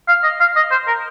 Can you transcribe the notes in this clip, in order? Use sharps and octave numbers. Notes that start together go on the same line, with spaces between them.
F5
D#5
F5
D#5
C5
A#4